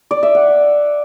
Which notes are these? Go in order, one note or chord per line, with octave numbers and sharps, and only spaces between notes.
D5
E5
F#5